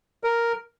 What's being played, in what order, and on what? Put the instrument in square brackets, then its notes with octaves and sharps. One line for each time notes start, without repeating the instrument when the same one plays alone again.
[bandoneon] A#4